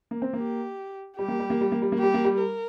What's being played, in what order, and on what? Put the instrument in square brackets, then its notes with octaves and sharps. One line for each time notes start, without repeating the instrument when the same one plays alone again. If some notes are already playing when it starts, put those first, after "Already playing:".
[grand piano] A#3
C4
[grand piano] A#3 [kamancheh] G4
[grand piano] G3 [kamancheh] G4
[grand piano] A#3
G3
A#3
G3
A#3
G3
A#3
[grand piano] G3 [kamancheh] G4
[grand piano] A#3
G3
[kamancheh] A#4